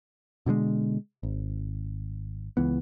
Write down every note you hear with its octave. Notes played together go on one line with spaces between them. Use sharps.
B2 D3 F#3 G#3
G#1
C#2 E3 B3